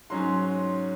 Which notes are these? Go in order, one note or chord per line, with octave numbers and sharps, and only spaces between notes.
G#2 F#3 C#4 C6